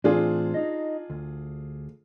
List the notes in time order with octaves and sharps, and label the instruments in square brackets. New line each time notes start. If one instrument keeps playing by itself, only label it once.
[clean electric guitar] A2 E3 C4 [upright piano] D4 F4 G#4
[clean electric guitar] D#4 D#5
D2